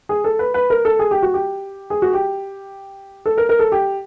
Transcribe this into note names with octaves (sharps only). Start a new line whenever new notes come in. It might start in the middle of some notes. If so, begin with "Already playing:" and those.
G#4
A4
B4
B4
A#4
A4
G#4
G4
F#4
G4
G#4
F#4
G4
A4
A#4
A#4
A4
G4